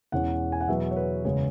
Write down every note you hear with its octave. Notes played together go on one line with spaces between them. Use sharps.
E1 E2 E3 C#4 F#5
G#5
F#5
E2 B2 F#3 B3 E5
C#5
B4
F#1 E2 C#3 G#3 B3 C#5